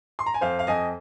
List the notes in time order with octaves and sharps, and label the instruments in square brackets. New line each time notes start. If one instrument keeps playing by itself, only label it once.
[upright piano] C6
A#5
G#5
F2 C5 F5
F5
F2 D#5 G#5